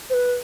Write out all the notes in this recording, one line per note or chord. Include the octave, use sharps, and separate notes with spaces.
C5
B4